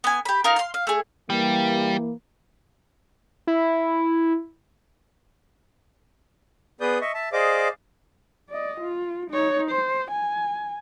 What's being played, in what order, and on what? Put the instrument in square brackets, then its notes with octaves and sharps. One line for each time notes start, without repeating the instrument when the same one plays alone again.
[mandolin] B3 G#5
G4 B5
D#4 F4 A#4
F5 C6
F5
A3 G#4
[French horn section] E3 A#3 [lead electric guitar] G3
[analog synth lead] E4
[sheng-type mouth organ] B3 G#4 B4 D5 D#6 G6
D#5 E5 C#6
E5 A5
G#4 C5 D5 D#5 F5 D6
[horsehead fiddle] D5 D#5
F4
D#4 C#5
C5
G#5